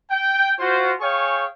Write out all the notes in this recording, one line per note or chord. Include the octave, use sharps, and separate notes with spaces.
G5
F4 F#4 C5
G#4 C#5 F5 G5 G#5 C#6